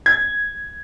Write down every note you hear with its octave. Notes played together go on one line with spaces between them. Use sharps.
G#6